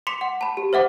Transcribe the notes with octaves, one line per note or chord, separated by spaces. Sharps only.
C6 D6 B6 C#7 E7
F#5
A5 B5
G4
C5 E5 F#5 D6